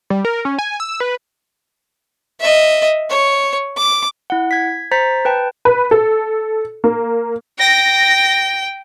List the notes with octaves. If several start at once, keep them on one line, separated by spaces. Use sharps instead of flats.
G3
A#4
C#4
G#5
E6
B4
D#5 E5
C#5
D6
E4 F#5
G#6 B6
C5 A#5 A6 B6
B4 G5 A5
B4
A4
A#3
G5 A#6